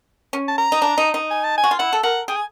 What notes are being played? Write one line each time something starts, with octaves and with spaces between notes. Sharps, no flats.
C#4
A5
A#5
D#4
D4
D#4
D#4
G#5
A5
G#5
F#4
F4
E4 F#5
A4
A#4 F#5
G#4 G5
G#5